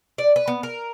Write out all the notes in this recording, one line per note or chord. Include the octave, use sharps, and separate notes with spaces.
D5
B4
B3
A#4